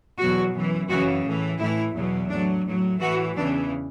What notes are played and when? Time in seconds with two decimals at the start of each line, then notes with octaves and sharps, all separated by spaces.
0.18 E2 B2 F#3 F#4
0.52 F#2 E3
0.88 F#2 C#3 E3 F#4
1.24 A2 E3
1.58 A2 E3 E4
1.94 E2 B2 F#3
2.29 A2 F#3 D4
2.64 A2 F#3
3.00 A2 E3 F#4
3.35 E2 C#3 E3 D4